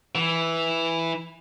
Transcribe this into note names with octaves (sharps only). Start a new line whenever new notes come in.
E3